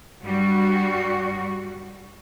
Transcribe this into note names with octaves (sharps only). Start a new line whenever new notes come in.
G2 G3 F#4